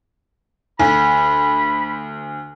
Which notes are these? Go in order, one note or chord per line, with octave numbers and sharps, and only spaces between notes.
D2 B5